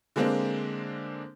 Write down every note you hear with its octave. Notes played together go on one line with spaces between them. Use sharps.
D3 G#3 A#3 C4 D4